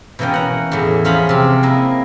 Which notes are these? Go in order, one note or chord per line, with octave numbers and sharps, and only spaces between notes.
B2 E3 A#3 C#4 G5
F#5 A#5
E2 A2
F3 C#4 F4 G#4 A#5 B5
C3 C4
A#3 E4 D#5